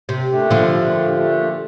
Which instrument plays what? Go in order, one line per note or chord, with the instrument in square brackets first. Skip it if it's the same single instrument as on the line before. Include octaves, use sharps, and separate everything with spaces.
[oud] C3
[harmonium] A#2 A3 D4 G4
[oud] D3 F3
[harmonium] A#2 A3 D4 G4
A#2 A3 D4 G4